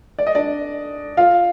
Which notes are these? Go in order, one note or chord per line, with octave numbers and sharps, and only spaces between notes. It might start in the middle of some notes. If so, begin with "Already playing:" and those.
D5
D#5
D4 D5
F4 F5